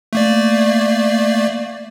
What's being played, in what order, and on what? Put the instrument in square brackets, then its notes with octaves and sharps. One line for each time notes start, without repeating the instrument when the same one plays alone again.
[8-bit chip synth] A3 A#3 D5